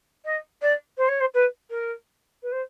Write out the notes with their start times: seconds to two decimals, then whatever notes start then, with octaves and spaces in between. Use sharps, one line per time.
0.25 D#5
0.62 D5
0.97 C5
1.08 C#5
1.20 C5
1.34 B4
1.70 A#4
2.42 B4
2.52 C5